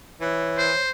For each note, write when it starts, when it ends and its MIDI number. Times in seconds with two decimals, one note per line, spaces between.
0.21 0.72 52
0.21 0.81 73
0.58 0.91 72